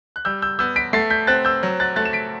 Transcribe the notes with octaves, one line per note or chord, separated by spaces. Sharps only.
F#6
G3 E6 G6
E6 G6
B3 E6 G6
B6 D7
A3 A6 C7
G6 B6
C4 F#6 A6
E6 G6
F#3
F#6 A6
A3 F#6 A6
E7
B6 D7